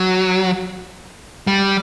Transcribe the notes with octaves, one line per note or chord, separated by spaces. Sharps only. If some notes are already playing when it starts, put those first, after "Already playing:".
Already playing: F#3
G3